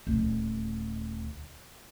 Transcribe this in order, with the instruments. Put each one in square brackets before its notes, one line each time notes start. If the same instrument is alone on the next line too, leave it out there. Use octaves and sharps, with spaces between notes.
[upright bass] D#1 D2